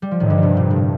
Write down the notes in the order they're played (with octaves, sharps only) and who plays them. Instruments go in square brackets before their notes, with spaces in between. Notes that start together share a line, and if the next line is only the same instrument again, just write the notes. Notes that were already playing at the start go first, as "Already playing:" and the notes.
[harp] G3
F3
[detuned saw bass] A2 [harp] D#3
[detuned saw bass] G2 [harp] D3
[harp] C3
A#2
A2